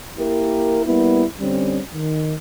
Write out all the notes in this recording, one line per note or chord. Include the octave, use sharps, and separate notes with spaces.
A#3 E4 G4 A#4
G3 A#3 B3 E4
D3 G3 C4 C#4
D#3